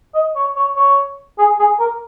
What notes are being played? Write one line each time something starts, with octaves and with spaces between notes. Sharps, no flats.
D#5
C#5
C#5
C#5
G#4
G#4
A#4